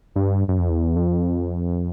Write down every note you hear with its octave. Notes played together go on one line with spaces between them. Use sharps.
G2
F#2
F2
E2
F2